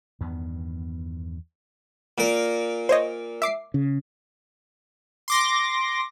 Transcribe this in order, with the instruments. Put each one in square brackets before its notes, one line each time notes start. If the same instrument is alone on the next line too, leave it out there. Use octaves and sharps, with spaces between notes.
[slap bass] E2 G2 D#3 B3
[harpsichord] A#2 A#4
[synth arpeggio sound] C5 C#5 D#5
E5 D6 C7
[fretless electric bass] C#3
[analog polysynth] C6 D6 A#6